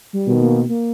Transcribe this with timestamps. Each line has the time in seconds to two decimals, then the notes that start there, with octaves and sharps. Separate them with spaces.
0.13 G3
0.26 B2 D#3
0.41 A#3
0.69 A#3